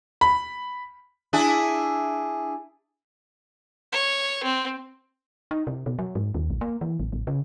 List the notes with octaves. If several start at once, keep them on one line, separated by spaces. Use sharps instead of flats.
B5
D4 E4 G#4
C#5
C4
D#4
C3
B2
F#3
G#2
D#2
A#1
A#3
E3
A1
A1
C#3